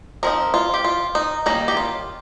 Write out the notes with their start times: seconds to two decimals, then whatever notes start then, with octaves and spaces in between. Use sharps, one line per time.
0.23 F3 C4 D#4 A#4
0.54 F4
0.74 G4
0.84 F4
1.15 D#4
1.46 D#3 G3 A#3 C#4 D#4
1.68 G4
1.77 F4